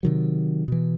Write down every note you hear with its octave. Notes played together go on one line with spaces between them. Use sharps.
C3 D#3 F#3
B2 E3